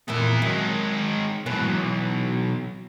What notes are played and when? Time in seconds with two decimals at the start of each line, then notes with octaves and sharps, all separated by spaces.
0.08 F2 A#2 E3 B3 E4
0.42 D#3 F#3 G#3
1.46 G#2 B2 E3 F#3 B3
1.67 B1